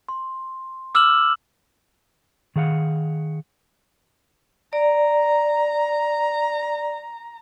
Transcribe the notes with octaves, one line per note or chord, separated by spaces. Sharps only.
C6
D6 E6 F6 E7 F#7
D#3 G#4 F5 F#5
D5 A#5